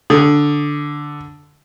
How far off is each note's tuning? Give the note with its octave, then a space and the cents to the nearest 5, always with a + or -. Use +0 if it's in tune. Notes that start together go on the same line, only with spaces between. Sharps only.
D3 +0 D#6 +0